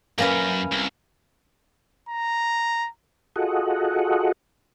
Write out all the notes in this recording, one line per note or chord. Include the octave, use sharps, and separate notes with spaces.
F#2 A#3 C#4 B4
C2
A#5
F4 F#4 G#4 A4 D#5 F#5